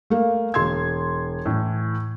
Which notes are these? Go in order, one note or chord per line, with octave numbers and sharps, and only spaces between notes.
A3 A#3
E1 C6 G#6
A2 E3